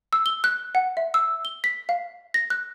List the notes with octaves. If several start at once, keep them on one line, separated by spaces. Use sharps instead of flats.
E6
G7
F#6
F#5
E5
E6
G7
B6
F5
A#6
F#6